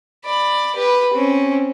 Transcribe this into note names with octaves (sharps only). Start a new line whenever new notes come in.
D5 B5
G4 B4
C4 C#4